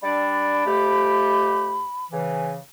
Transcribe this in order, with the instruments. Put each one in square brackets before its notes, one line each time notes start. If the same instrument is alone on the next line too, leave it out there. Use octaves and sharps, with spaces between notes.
[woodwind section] G3 D4 D5 [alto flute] B5
[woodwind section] F2 A3 G4
C#3 E3